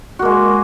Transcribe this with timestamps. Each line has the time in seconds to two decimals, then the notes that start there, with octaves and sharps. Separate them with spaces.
0.19 F#4
0.22 A#3
0.25 G#3